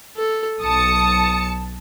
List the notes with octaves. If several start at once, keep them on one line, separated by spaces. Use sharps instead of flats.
A4
B1 A5 D#6 C#7